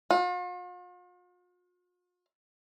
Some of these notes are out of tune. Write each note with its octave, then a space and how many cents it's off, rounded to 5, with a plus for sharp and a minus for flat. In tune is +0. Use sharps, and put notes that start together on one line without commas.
F4 +45